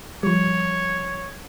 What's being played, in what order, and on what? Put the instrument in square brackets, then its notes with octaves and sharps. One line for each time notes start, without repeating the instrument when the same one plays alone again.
[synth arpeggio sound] F3 G3 [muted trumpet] C#5